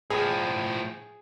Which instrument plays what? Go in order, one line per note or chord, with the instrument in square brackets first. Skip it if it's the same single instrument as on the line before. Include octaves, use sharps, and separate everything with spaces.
[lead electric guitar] A2 F3 [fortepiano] G#4